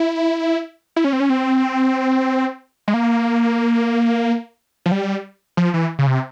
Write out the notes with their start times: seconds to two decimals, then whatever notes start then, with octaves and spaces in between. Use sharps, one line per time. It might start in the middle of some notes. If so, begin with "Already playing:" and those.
Already playing: E4
0.96 E4
1.04 C#4
1.13 C4
1.20 C#4
1.29 C4
2.88 G#3
2.94 A#3
4.86 F3
4.92 G3
5.57 F3
5.74 E3
5.99 C#3
6.07 C3